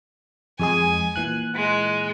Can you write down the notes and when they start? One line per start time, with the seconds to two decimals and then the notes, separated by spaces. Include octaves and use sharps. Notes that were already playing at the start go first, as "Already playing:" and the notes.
0.60 F2 G#3 G#4 G#5
1.16 A#2 E3 F#6
1.55 G#3